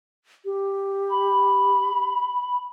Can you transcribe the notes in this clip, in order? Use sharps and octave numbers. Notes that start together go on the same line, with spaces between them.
G4
B5